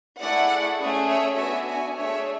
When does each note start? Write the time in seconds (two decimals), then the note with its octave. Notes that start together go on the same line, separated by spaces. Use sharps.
0.20 A3 E4 G#4 D5 F#5
0.79 A3 C#4 G#4
1.08 C#5 E5
1.37 B3 D4 F#4 E5 G#5
1.66 E5 G#5
1.95 A3 D4 G#4 C#5 E5